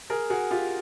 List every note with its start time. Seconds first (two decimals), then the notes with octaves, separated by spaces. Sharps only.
0.10 G#4 A#4
0.30 F#4 G#4
0.51 F4 G4